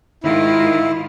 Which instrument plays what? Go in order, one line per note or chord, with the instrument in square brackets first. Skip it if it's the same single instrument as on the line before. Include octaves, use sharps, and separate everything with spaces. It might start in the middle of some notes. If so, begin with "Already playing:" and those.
[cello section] G#2 D#3 F4 [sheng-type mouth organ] E4